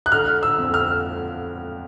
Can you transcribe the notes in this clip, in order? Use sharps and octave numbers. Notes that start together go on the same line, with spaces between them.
F#6
D3 F6
E6
F2
F6